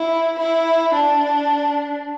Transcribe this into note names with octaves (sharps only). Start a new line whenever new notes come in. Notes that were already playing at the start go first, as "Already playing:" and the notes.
Already playing: E4
E4
D4